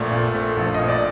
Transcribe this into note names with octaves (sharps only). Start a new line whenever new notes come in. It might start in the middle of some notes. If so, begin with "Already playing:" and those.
Already playing: A#1 A#2 F3 A3 D5
A#2
A3
A#1
A#2 D#5
D5